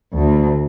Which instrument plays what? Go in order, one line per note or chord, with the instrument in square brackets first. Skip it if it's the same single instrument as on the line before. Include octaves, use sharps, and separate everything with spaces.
[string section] D2